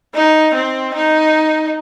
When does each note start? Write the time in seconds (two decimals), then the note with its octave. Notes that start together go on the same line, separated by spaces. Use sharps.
0.14 D#4
0.54 C4
0.95 D#4